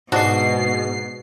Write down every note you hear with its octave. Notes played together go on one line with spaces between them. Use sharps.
G#2 B2 D4 F#4 D5 D#5 C7